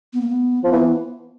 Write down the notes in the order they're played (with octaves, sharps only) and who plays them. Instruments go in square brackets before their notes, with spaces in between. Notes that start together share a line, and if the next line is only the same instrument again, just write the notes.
[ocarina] B3
A#3
B3
[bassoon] F3 [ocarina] C4
[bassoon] E3 [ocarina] B3